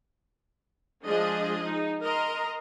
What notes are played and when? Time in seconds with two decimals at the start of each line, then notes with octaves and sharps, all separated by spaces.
1.05 F3 G#3 D4 G#4 D#5
1.64 D#4
2.03 A#4 D#5 A#5 C6